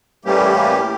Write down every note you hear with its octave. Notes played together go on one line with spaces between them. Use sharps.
A2 E3 G3 A#3 C#4 G4
A2